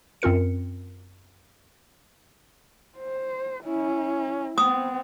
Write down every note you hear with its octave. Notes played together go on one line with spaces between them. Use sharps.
F#2 C4 F4 A#4 C#7
C5
C#4 E4
B3 C4 D#6